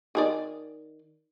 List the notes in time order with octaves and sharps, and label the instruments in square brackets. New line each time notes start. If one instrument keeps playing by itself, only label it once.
[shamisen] D#3 G#4 D5